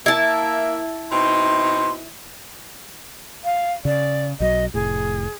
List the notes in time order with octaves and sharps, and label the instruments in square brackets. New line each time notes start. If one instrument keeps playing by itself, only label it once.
[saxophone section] A#3 E5 [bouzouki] E4 A5
[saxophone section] B2 C4 D#4 [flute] C6
[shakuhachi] F5
[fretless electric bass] C#3 [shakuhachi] D5
[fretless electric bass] B1 F#3 [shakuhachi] D#5
[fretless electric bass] F1 A2 [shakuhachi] G#4